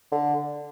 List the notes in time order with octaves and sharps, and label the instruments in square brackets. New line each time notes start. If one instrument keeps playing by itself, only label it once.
[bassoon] D3